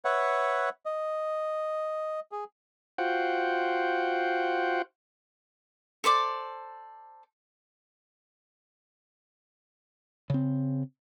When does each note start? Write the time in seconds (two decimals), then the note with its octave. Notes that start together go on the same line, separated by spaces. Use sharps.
0.05 B4 C#5 E5 F#5
0.85 D#5
2.32 G#4
2.98 F4 F#4 C5 F#5 G5
6.04 A4 C5 D5 D6
10.30 C#3 C4